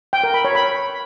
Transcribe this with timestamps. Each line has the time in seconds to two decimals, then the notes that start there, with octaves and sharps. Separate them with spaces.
0.13 G5
0.23 A#4
0.34 B5
0.45 C#5
0.55 B5